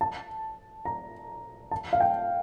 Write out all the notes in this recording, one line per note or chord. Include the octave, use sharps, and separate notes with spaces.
A5
A#5
A5
F5
G5